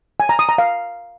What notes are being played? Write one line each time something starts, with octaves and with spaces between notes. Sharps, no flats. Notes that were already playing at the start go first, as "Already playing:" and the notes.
G#5
A#5
D#6
A#5
F5